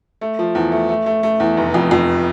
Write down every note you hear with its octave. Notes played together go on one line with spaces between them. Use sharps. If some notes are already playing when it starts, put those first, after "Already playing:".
A3
F3
E2
A3
A3
A3
A3
E2
F1
F2
F2